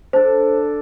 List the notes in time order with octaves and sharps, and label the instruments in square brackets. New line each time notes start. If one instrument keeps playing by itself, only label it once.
[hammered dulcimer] D4 A4 [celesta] C5